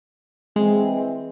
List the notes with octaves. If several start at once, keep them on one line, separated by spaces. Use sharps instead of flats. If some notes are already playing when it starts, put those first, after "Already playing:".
E3 G#3 C4